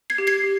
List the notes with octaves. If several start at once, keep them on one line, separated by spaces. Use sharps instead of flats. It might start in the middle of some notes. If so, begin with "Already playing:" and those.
G#6 C7
G4
G#6 C7
G4